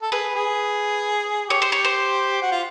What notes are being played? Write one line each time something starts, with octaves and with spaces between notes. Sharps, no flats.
A4
G#4 B4
G#4
G4 C#5
C5
C#5
C5
F#4
F4